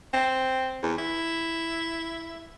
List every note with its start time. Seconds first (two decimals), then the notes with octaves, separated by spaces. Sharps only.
0.13 C4
0.83 E2
0.98 E4